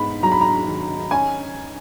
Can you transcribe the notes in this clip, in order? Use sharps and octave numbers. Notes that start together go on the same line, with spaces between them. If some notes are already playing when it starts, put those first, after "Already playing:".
Already playing: G#2 B3 B5
F#3 A#5
B5
A#5
D#3
C#4 G#5